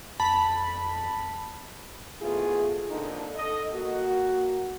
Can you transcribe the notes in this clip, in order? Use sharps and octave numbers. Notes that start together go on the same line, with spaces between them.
F2 A5 B5
G#2 B2 E3 A3 F4 G#4
F2 A#2 D3 D#4
A4 D#5
A#3 F#4